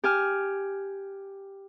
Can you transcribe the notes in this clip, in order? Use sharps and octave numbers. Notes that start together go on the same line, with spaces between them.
G4 G#5 F6